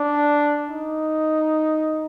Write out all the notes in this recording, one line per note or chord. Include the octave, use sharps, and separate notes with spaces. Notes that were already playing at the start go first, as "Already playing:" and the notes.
Already playing: D4
D#4